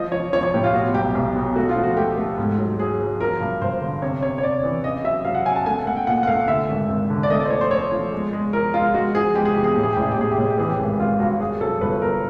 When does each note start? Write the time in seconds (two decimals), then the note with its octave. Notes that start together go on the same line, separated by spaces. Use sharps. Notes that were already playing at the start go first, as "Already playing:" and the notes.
Already playing: F3 D#5
0.12 F3 C#5
0.33 F3 C#5
0.43 C#5
0.54 A2 G4
0.64 F4
0.73 B2 F#4
0.94 B1 G4
1.15 B1
1.36 B2
1.56 A3 F#4
1.69 F4
1.76 F3
1.83 F#4
1.96 A3 G4
2.17 A3
2.38 G#2
2.59 F#3
2.79 F#3 G#4
2.99 F#3
3.20 F3 A#4
3.40 G2
3.61 G2 C5
3.81 D3
4.02 C3 C#5
4.22 C3 C#5
4.38 C#5
4.43 C3 D5
4.64 E3
4.84 C#3 D#5
5.04 F#3 E5
5.25 F#3 F5
5.35 F#5
5.46 C#3 G#5
5.56 A5
5.66 A3 G#5
5.86 A3 F#5
5.97 G5
6.07 A#2 F#5
6.23 F#5
6.27 A3 F5
6.48 D3 E5
6.69 G#1
6.89 G#1
7.10 D3
7.23 D5
7.30 A3 D#5
7.40 D5
7.45 C5
7.50 F3 C#5
7.61 C5
7.71 A3 C#5
7.92 F3
8.12 G#3
8.33 G#3
8.53 F3 A#4
8.74 G#3 F4
8.94 G#3 F#4
9.15 F3 G#4
9.35 G#3 G4
9.45 G#4
9.54 E2 G4
9.64 G#4
9.74 A2 G4
9.83 G#4
9.93 A1 G4
10.02 G#4
10.11 G4
10.17 A2 G#4
10.32 G4
10.38 A2 G#4
10.50 G4
10.58 E3 G#4
10.69 G4
10.79 G#1
10.99 G#1 F4
11.19 G2 F#4
11.40 G2 G#4
11.61 F#3 A4
11.81 G1 B4
12.02 G2 A#4